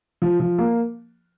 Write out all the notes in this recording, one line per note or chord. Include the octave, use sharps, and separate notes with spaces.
F3
F3
A#3